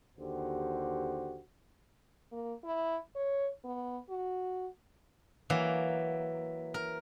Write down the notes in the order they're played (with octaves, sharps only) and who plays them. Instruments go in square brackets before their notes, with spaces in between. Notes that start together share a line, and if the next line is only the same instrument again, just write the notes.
[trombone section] D#2 D3 F#4 G4 C5
[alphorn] A#3
E4
C#5
B3
F#4
[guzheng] E3 F#3 A#3
A#4